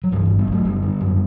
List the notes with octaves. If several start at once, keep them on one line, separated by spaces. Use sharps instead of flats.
F#3
G2 E3 G3
G1 E3
G3 B3
G1 F#3 A3
F#1 G3 B3
D3
F#2